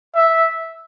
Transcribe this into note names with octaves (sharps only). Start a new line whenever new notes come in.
E5